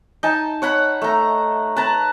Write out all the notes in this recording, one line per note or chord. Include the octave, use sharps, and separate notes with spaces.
D#4 G#5 A5
C#5 F#5 B5
A3 A#5
B4 A5 A#5